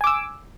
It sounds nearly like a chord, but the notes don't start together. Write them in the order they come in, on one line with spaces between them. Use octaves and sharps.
G#5 D6 E6